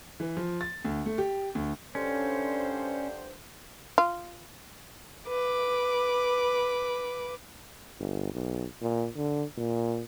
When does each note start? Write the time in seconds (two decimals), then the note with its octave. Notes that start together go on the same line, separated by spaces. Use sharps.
0.20 E3
0.37 F3
0.61 A6
0.85 D2
1.06 A3
1.18 G4
1.55 D2
1.95 G2 D3 C#4 C5
3.98 F4
5.27 B4 D6
7.99 G1
8.33 B1
8.81 A#2
9.16 D3
9.58 A#2